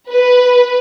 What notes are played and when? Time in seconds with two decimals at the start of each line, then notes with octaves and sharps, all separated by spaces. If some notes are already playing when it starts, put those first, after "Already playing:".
0.10 B4